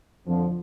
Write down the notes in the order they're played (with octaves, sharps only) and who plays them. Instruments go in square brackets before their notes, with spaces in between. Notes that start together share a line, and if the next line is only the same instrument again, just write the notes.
[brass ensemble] F2 D3 F3